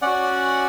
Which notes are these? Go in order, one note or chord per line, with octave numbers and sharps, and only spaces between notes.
C#4 F#4 D5 F#5